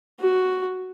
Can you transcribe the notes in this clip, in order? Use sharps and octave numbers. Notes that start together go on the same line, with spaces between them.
F#4